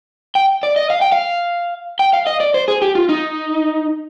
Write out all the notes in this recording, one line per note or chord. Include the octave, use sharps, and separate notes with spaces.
G5
D5
D#5
F5
G5
F5
G5
F5
D#5
D5
C5
G#4
G4
F4
D#4